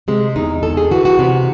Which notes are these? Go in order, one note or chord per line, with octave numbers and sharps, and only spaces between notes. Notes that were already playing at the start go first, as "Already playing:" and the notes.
C3 G#3
E2 D#4
E2 A4
G#4
E3 F#4
F#4
C3